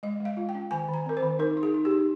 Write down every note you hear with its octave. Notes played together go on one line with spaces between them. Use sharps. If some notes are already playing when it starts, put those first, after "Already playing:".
G#3 D#5
G#3 F5
F4
G5
C#4
D#3 G#5
D#3
A#5
C4 A#4
C5
D#3
D#4 A#4
D#4
G#4
D#4
G4
D#4